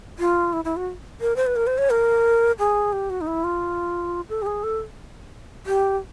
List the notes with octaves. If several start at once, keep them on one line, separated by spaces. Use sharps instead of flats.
F4
E4
E4
F#4
A#4
C5
B4
A#4
C5
C#5
A#4
G#4
G4
F#4
D#4
E4
F4
A4
G4
G#4
A4
G4